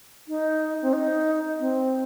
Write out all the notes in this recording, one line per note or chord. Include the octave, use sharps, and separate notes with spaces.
D#4
C4
D#4
C4